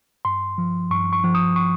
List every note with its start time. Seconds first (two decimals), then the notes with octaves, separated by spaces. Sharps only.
0.25 G2 C6
0.58 F3
0.91 G2 C#6
1.13 C#6
1.24 F3
1.35 D#6
1.56 C#6